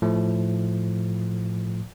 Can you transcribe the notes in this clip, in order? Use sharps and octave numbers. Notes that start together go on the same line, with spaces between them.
A2 F3 A3